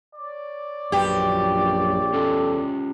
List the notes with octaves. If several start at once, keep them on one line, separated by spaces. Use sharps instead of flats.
C#5 D5
A#1 F#2 F#3 G4 B4
E2 C#4 F4 A4 F#5